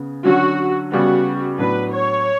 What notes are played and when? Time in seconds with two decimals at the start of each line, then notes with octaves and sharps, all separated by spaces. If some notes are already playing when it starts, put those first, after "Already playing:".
Already playing: C#3 B3
0.25 D3 F#3 C#4 F#4
0.92 C#3 G3 B3 F#4
1.58 A2 F#3 B3 D4 F#4 B4
1.92 C#5